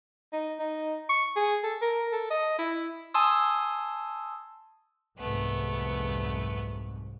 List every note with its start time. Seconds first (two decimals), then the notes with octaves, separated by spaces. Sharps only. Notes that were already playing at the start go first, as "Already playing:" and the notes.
0.33 D#4
0.60 D#4
1.09 C#6
1.36 G#4
1.64 A4
1.82 A#4
2.12 A4
2.30 D#5
2.59 E4
3.14 G#5 A5 C6 D#6 E6
5.19 C2 F2 G#2 A3 B3